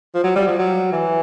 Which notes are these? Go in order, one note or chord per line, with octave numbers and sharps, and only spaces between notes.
F3
F#3
G3
F3
F#3
E3